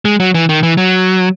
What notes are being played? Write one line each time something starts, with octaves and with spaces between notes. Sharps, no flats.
G#3
F#3
E3
D#3
E3
F#3